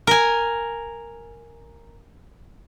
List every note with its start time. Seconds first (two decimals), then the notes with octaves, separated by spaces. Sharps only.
0.07 A#4 G#5